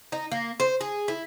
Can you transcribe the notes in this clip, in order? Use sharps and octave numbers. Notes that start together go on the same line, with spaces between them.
D#4
A#3
C5
G#4
E4